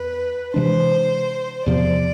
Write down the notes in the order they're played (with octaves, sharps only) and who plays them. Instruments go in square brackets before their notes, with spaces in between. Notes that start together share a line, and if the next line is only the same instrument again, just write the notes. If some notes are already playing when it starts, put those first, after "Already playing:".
Already playing: [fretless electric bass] E2 [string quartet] B4
[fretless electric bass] C3 E3 G#3 D4 [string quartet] C5
[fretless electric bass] E2 C3 F3 [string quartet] D5